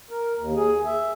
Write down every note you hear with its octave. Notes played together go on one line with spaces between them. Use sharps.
A#4
D#2
G#4
E5